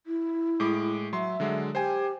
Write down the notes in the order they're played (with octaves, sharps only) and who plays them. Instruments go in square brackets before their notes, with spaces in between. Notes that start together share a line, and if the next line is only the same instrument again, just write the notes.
[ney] E4
[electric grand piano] A2 G#3 D6
[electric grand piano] F#3 C6 [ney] E5
[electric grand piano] D3 F#3 G#3
[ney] G4 [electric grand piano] C5 G5 G#5